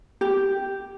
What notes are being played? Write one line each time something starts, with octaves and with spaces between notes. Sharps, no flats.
G4